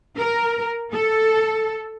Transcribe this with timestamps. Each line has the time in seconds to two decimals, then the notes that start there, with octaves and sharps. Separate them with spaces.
0.17 A#4
0.93 A4